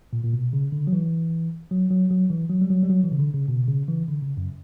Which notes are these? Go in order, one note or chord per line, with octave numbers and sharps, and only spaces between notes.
A#2
A#2
B2
C#3
D3
F#3
E3
F#3
F#3
F#3
E3
F#3
G3
F#3
G3
F#3
E3
C#3
D3
C#3
B2
C#3
E3
D3
C#3
F#2